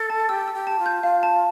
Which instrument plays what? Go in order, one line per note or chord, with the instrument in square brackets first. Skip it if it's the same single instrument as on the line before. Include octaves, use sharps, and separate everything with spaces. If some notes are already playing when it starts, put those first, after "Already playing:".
Already playing: [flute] A4
[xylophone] A5
[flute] G4 [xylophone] E6
[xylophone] E6
[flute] G4
[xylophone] A5
[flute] F4
[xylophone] G6
[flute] F4 [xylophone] F5
[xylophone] A5